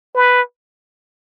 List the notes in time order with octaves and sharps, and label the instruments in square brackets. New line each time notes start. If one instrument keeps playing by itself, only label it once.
[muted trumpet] B4